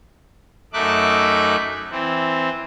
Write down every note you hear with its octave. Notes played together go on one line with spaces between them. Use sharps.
F#2 A3 D#4 E5 D6 F#6
E3 C4